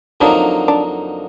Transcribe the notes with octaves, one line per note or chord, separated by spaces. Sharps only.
F2 D3 F#3 A#3 D4 D#4
D4